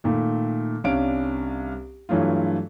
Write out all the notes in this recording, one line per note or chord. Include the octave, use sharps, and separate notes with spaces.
A#2 D#3 A3
C2 C#4 D4 F5 D7
G2 E3 F#3 A3 F4